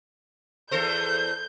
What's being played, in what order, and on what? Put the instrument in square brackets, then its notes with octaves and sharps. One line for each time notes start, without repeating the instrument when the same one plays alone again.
[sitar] E2 A4 C5 [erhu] G6